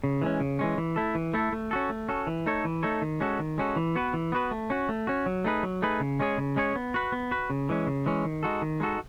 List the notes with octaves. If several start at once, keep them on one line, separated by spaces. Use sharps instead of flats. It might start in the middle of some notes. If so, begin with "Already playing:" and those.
C#3
E3 G#3 C#4
C#3
E3 G#3 C#4
E3
A3 E4 A4
E3
A3 E4 A4
A3
C#4 F#4 A4
A3
C#4 F#4 A4
E3
A3 D#4 A4 C#5
E3
A3 D#4 A4 C#5
D#3
G#3 C#4 F#4 A4
D#3
G#3 C#4 F#4 A4
E3
B3 F#4 B4
E3
B3 F#4 B4
A3
C#4 F#4
A3
C#4 F#4
F#3
A3 D#4 G#4 B4
F#3
A3 D#4 G#4 B4
C#3
G#3 C#4 G#4 C#5
C#3
G#3 C#4 G#4 C#5
B3
F#4 B4
B3
F#4 B4
C#3
E3 G#3 C#4
C#3
E3 G#3 C#4
D#3
G#3 D#4 F#4 A4
D#3
G#3 D#4 F#4 A4